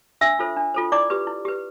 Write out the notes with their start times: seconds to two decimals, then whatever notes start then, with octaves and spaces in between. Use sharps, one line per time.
0.21 D4 E5 E6
0.39 F4 A4 C5
0.57 D4
0.75 F4 A4 C5
0.92 E4 D5 D6
1.10 G4 B4
1.27 E4
1.45 G4 B4